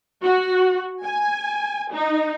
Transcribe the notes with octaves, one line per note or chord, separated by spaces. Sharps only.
F#4
G#5
D#4